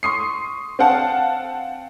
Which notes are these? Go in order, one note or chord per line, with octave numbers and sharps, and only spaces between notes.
C6 C#6 D#6 C7
C4 F5 F#5 A5